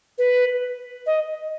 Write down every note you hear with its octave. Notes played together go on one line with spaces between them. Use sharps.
B4
D#5